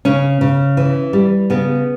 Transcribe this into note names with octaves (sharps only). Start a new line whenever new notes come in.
C#3 C#4
C#3
E3
G3
C#3 B3